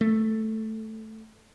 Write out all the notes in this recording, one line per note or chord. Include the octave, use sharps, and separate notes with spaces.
A3